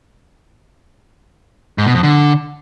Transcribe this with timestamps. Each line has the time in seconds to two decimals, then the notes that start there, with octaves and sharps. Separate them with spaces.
1.78 G#2
1.87 B2
1.95 F2
2.03 D3